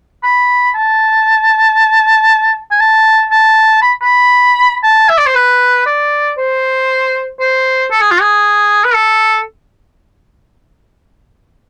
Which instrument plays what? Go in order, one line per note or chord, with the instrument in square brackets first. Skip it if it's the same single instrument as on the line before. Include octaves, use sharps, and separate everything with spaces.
[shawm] B5
A5
G#5
A5
A5
B5
B5
A5
E5
D5
C5
B4
D5
C5
C5
A4
G#4
F4
G#4
B4
A4